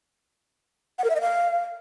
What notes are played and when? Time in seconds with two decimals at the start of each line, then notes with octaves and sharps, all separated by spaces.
0.98 F#5
1.04 A#4
1.10 E5
1.15 D#5
1.21 F5